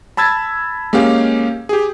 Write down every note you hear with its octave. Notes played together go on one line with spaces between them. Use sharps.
A5 B5 E6 G#6 A6
G#3 A#3 C#4 G4 F5
G4 G#4